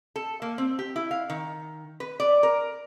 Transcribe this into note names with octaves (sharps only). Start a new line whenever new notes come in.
A4
A#3
C4
G4
E4
F5
D#3
B4
D5
A#4